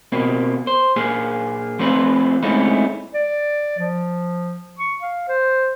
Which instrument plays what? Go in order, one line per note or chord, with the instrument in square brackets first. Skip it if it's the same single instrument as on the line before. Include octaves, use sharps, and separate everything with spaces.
[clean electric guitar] B2 A#3 C4
C5
A#2 A#3 G#4
F3 A3 C4 F4 B4
G#3 A3 C4 C#4 D#4 E4
[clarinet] D5
F3
C#6
F5
C5